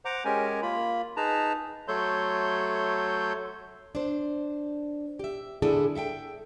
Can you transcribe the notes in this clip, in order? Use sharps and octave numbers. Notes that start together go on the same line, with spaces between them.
C5 F#5 A#5 D6
G#3 C#4 G4 A#4 G#5
A#3 F4 B5
D#4 G#4 B4 A5 A#5
F#3 A3 A4 C#5 C6 G6
D4 C5
G4 E5
D3 D4 E4 G#4 A4
A4 E5 F#5 G5